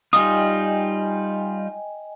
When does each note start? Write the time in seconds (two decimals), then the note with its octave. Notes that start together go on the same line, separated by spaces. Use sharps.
0.13 G3 D#4 F4 D#5 G5 G#5 D#6